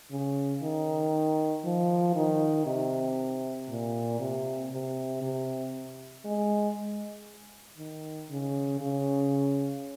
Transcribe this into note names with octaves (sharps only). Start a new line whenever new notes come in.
C#3
D#3
F3
D#3
C3
A#2
C3
C3
C3
G#3
D#3
C#3
C#3